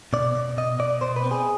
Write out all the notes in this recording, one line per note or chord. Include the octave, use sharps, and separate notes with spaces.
B2 D5
B2
B2 D#5
B2 D5
B2 C5
B4
C4
G#4